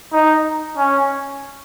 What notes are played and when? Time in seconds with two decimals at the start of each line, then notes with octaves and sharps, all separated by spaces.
0.13 D#4
0.77 C#4